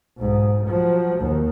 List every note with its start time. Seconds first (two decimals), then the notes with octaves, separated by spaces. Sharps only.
0.17 B1 G#2
0.67 F3 F#3
1.20 D#2